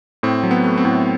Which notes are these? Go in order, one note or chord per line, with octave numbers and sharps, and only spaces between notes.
A2 C4
F#3
B3
A3
C4
A2